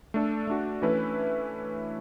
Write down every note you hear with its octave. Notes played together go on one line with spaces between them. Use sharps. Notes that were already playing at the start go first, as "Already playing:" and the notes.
A3 D4 A4
A3 D4 F#4
E3 A3 C#4 E4 B4